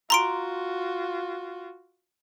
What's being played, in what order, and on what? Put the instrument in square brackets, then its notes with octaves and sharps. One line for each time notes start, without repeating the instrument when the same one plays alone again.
[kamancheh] F4 F#4 [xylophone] A#5 C6 D7